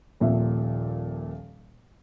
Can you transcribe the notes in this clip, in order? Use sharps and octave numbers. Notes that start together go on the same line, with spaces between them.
D#1 A#2 F3 E5